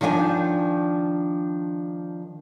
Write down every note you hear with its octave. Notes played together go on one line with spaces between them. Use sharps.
D#3 F3 D4 F5 G#5